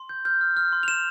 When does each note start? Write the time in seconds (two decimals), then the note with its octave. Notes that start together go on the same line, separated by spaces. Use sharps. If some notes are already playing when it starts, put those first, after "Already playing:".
Already playing: C6
0.09 G6
0.25 F6 G6
0.41 F6
0.57 F6
0.73 C6
0.83 F7
0.88 C6 E7